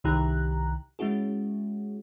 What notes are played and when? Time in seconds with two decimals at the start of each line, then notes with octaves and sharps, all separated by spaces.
0.04 C2 D#3 E4 G4 A#5 F#6
0.99 G#3 C#4 E4 F#4 G#4